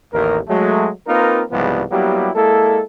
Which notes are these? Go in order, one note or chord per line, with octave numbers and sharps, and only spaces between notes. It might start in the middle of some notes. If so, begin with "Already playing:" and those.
A1 D#2 A#4
F#3 G#3 A3
A#3 C4 D#4 F4 A#4 B4
C2 G#2 C#3 F3 G3 B3
F#3 G3 A#3 B3 E4 G4
G#3 A#3 E4 A4